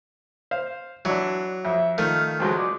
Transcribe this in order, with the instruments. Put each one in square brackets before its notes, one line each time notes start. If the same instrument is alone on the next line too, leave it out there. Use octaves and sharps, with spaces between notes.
[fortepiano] C5 F5
[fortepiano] E3 D4 [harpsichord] F#3
[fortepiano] F2 [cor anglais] E5
[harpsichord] D#3 A3 [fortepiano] F3 [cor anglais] F5
[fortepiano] C#2 F#3 G#3 [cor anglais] F3
[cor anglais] D5